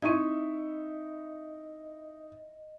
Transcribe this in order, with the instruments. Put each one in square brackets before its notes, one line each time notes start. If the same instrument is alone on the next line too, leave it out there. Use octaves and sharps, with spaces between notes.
[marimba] C4 G#6 [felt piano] D#4 C#6 [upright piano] E4 E5 [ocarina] D#5